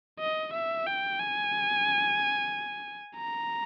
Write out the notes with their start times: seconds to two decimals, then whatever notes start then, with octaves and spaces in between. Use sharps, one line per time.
0.20 D#5
0.54 E5
0.87 G5
1.19 G#5
3.17 A#5